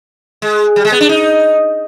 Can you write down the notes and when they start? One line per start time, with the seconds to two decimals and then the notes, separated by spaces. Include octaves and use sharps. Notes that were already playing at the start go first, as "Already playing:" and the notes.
0.42 G#3
0.76 G3
0.85 G#3
0.92 B3
1.01 D4
1.09 D#4